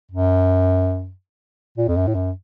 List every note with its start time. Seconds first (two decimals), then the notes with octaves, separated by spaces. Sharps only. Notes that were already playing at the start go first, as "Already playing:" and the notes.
0.11 F#2
1.78 A#2
1.88 F2
1.96 F#2
2.07 A2
2.14 F#2